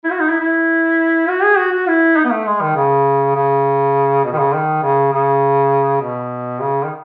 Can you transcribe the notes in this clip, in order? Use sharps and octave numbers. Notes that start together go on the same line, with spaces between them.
E4
F#4
D#4
E4
E4
F#4
G#4
F#4
F#4
E4
D#4
B3
A3
G#3
D#3
C#3
C#3
B2
D#3
C#3
D#3
C#3
C#3
B2
C#3
D#3